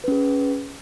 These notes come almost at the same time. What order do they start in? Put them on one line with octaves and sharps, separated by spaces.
B4 C#4 G#4